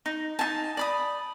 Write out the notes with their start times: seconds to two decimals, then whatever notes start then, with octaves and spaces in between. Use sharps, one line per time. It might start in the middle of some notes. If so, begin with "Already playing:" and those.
0.06 D#4
0.39 D#4 F4 G#5 A5
0.77 D5 B5 D#6